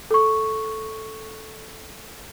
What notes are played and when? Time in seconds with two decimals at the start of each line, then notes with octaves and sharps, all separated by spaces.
0.11 A4 C#6